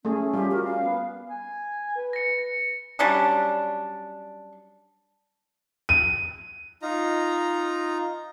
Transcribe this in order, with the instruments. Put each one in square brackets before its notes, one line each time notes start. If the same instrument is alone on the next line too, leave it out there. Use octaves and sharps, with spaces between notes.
[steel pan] A3 G#4 [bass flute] C#4
[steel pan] G3 F4 [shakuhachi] G4
[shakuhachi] F#4 [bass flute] A#4
[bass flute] C#4 [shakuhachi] F5
[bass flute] B3
[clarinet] G#5
B4
[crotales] A#6 C#7
[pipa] F#3 G3 C#4 D4
[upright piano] D#7
[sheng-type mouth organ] D#4 F4 A#5